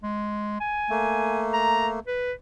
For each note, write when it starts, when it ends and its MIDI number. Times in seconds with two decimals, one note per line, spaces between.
0.04 0.60 56
0.60 1.45 80
0.90 1.99 57
0.90 1.99 58
1.54 1.87 82
2.07 2.33 71